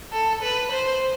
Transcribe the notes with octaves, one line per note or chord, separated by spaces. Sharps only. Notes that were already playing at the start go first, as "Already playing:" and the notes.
A4
B4
C5